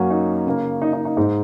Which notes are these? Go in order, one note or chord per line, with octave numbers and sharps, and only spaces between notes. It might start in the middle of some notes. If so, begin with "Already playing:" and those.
Already playing: F#2 F#3 A#3 C#4 F#4
D#4
C#3 A#3
D#4
D#4
D#4
G#2 G#3 D#4